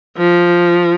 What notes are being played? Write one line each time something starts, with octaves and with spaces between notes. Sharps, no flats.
F3